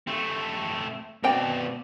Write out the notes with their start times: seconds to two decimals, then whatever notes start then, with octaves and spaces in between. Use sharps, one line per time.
0.07 A3 C4
1.24 B2 C4 D5 G5